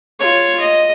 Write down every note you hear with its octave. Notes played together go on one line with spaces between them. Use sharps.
F4 C#5
D#5